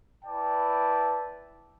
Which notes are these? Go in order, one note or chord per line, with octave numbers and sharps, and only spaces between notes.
E4 B4 D5 G5 A5